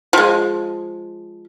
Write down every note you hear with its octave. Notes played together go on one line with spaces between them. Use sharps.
F3 G#3